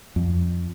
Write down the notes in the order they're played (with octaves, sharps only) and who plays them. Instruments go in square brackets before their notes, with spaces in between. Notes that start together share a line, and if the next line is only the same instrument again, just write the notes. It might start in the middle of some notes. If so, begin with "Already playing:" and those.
[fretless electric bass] F2